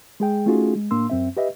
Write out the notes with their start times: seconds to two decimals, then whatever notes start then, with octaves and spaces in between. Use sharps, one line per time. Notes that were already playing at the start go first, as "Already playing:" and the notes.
0.20 G#3 G#4 G5
0.46 A3 C#4 D#4 F4 F#4 G#4
0.75 G#3
0.91 A2 A#3 D4 C6 E6
1.10 F#2 C4 E5
1.37 G4 B4 D#5 E5